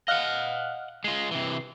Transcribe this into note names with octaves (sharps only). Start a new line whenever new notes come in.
D#5 F5 F#5 F6 F#6
G#3 F4 C7
C3 E3